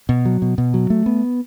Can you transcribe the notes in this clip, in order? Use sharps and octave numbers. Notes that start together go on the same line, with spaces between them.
B2
F#3
B2
B2
F#3
A3
B3